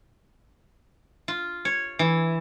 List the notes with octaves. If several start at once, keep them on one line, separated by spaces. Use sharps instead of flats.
F4
C#5
E3